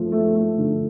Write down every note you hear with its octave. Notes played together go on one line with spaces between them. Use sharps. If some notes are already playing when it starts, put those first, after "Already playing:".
Already playing: F3 A3
A3
A3
D3